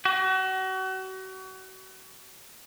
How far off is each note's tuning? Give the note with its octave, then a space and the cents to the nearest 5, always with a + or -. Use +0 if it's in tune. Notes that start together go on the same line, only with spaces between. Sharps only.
F#4 +35